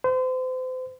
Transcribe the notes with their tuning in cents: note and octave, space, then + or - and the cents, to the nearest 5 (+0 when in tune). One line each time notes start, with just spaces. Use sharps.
C5 -35